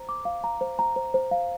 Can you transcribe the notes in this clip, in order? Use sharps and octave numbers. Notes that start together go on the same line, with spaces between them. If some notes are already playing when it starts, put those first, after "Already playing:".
Already playing: C5 A#5
D6
F5
A#5
C5
A#5
C5
C5
F5